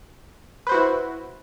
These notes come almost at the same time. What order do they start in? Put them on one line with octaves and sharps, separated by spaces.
B4 C5 F#4 E4